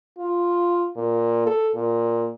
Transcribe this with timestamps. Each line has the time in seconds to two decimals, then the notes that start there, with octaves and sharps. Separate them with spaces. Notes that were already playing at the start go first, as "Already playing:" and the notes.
0.18 F4
0.96 A#2
1.47 A4
1.75 A#2